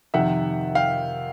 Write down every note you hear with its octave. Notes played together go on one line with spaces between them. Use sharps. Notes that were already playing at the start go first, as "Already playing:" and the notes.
F2 C3 D#3 E5 F#5
F5 G5